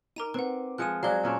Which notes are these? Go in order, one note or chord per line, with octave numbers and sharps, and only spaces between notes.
D#4 A#4 A#5 D6 D#7
C4 B4 F#5
F3 G#3 F#6 C#7 D#7
F#3 G#3 C5 D5 F5 A5 G7
A#2 C#4 D4